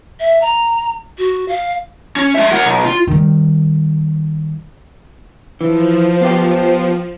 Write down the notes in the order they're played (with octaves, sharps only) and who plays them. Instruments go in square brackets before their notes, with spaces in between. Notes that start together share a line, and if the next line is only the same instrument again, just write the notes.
[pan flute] E5
A#5
F#4
F5
[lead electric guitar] C#4
G#3 E5
A#4 F#5
B1
F4
[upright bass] D#3 G3
[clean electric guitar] E3 [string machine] F3
[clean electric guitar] B3 F4 G4